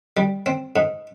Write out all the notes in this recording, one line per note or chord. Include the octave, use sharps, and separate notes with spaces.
G3
C4
G#2